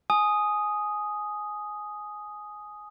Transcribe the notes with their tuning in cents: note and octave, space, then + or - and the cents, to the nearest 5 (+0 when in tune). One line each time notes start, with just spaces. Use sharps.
G#5 +15 D#6 +0